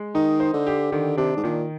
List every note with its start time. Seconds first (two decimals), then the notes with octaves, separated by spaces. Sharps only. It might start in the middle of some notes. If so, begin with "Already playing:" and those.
Already playing: G#3
0.14 D#3 D#4
0.40 C5
0.53 D3
0.67 G4
0.92 D3 D#3
1.17 C3 D4
1.37 G#2
1.44 A#2 D#3